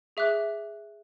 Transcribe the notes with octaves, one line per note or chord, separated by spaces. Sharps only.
G#4 E5 D6 F#6